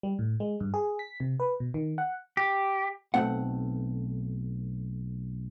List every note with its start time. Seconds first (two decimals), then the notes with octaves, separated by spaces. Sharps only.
0.03 G3
0.19 A2
0.40 G#3
0.60 G2
0.74 G#4
0.99 B6
1.20 C3
1.40 B4
1.60 B2
1.74 D#3
1.98 F#5
2.37 G4
3.14 B1 D3 A3 C4 F#5